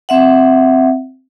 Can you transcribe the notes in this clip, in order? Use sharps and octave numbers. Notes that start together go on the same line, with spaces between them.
C4 E5 F#5